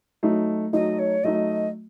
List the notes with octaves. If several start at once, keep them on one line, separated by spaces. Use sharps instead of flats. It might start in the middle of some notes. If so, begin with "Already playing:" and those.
F#3 A3 D#4
F#3 A3 D#4 D#5
C#5
F#3 A3 D#4 D#5